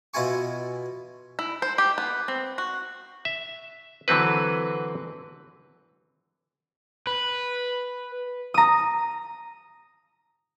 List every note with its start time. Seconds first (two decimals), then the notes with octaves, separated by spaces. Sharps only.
0.14 B2 E4 F4 G#5 C#6
1.39 E4
1.62 C5
1.78 G4
1.98 B3
2.28 C4
2.58 F#4
3.25 E5
4.08 D3 E3 F#3 C4 B4
7.07 B4
8.54 A#5 D#6